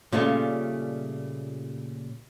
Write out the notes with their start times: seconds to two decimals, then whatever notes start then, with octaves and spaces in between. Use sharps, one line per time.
0.12 A#2 C#3 G3 A3 C#4 F4